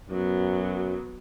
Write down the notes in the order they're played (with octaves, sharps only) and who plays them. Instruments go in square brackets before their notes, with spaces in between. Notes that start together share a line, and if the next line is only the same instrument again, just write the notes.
[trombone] F#2 [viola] F#3 B3